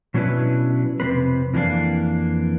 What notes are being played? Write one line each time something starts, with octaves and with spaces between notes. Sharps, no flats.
B2 F#3 C#4 D4 E4 B4
F2 C3 F3 C4 B4
F2 E3 A#3 D4 F5